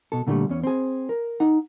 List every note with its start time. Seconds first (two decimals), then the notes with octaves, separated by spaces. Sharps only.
0.12 B2 A4
0.27 A#2 D3 F#3 G3 A3
0.49 E2 C#4
0.64 C4 G#4
1.09 A#4
1.40 D#4 F#5